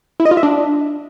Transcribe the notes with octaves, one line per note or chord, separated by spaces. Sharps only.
E4
D#5
F4
E5
D4